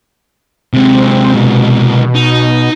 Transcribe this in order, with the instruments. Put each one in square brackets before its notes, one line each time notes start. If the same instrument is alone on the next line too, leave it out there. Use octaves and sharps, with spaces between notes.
[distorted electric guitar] C3 G#3 [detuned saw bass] C4
[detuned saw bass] B2
[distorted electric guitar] D#4